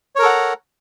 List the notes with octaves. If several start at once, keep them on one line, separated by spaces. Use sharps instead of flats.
A4 A#4 C#5 F#5 A#5